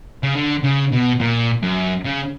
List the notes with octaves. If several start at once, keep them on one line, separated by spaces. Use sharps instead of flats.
C#3
D3
C#3
B2
A#2
F#2
C#3